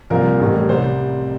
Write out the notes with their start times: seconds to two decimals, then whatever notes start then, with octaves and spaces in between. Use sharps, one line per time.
0.10 C2 A#2 F3 A#4
0.40 A1 A2 G3
0.69 C2 C3 G3 C5